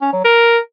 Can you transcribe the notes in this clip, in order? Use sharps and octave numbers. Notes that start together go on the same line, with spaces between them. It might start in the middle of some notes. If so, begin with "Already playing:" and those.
C#4
F#3
A#4